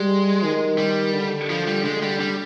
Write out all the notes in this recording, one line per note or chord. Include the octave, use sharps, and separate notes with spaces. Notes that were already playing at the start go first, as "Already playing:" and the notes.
Already playing: G3 G#3
D#3
G3
D3
F3
G3
D3 G#3
G3
G3